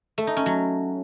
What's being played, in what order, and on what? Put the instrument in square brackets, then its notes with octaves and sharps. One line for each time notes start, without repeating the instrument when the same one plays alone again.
[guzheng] A3
D#4
C#4
F#3